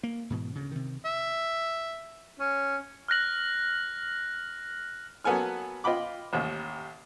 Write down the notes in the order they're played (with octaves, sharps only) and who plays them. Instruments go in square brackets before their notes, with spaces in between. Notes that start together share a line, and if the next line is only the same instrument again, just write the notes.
[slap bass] A#3
G#2 B2 E3
D2 C#3
C3 D#3
[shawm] E5
[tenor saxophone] C#4
[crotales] F6 F#6 A#6 F#7
[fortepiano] F#3 A#3 B3 A4 G#5 F6
F4 D#5 G5 B5 D6
A1 D#2